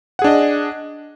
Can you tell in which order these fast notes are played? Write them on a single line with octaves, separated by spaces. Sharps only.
F#5 G#4 D4 D#5